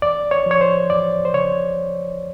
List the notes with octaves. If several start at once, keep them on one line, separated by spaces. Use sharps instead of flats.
E2 D5
C#5
F3 C#5
C5
E2 D5
C5
C#3 C#5